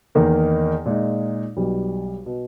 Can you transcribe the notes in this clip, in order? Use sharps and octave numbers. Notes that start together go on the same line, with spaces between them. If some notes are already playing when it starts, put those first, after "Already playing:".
E2 D#3 A#3 D#4
A#2 G#3 D#4
B1 B2 G3
B2